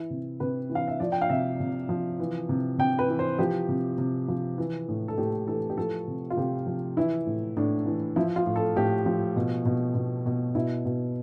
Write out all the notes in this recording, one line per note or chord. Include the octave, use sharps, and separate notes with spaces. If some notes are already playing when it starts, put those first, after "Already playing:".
Already playing: E3 E4
C3
C3 B4
E3
F5
E5
F3 D5
G5
F5
C3 E5
C3
F3
E3
C3
C3 G5
B4
E3
C5
F3 G4
C3
C3
F3
E3
A2
A4
A2 G4
E3 A4
G4
F3 A4
C3
F4
C3 G4
F3
E3 E4
A2
A2 D4
E3
F3 E4
F4
A2
A4
A2 G4
F3
B2
B2
B2
B2
B2 E4
B2